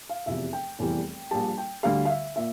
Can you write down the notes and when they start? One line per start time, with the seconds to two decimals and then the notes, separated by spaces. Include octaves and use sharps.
0.09 F5
0.26 F1 E2 C3 F3 E5
0.53 G5
0.79 F1 E2 E3 G3
1.31 A#1 A#2 G3 A5
1.58 G5
1.83 D2 D3 G3 F5
2.05 F5
2.09 E5
2.36 A#2 E5